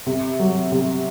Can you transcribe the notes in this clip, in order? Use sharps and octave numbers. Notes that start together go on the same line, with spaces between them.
C3
F#3
C3